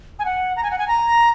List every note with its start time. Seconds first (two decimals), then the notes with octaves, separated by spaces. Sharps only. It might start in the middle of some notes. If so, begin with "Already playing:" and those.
0.19 G#5
0.25 F#5
0.57 A#5
0.63 G#5
0.71 F#5
0.79 G#5
0.88 A#5